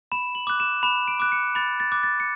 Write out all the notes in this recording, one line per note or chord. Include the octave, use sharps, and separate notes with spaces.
B5 E7
F#7
D6 F#6
E7
B5 E7
D7
D6 F#6
C#7
B5 A6
A6
D6 F#6
A6
C#7